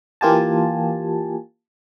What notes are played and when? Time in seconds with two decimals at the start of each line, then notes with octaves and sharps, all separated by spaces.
0.21 E3 A#3 F4 G4 G#5 A5